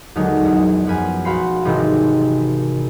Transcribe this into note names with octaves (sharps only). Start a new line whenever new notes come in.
D#2 D3 F#3 G#3 D#4
A#1 E2
F#2 F3 B4 G#5
B1 F#4 F5 B5 C6 C7
G#1 G#2 C3 D#3 E3